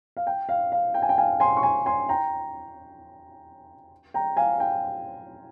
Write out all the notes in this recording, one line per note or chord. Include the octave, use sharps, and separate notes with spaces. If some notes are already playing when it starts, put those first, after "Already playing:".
F5
G5
F5
F5
G5
G#5
G5
F5 G#5
G#5 C6
C#6
G#5 C6
G#5 C6
G5 A#5
G5 A#5
F5 G#5
G5